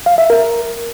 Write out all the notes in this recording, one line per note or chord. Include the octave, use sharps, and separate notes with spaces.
F5
E5
A#4